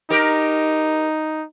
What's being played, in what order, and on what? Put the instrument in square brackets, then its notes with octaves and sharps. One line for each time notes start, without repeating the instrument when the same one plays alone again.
[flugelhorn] D#4 [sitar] G4 A#4